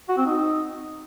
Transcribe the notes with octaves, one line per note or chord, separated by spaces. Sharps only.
F#4
C4
D#4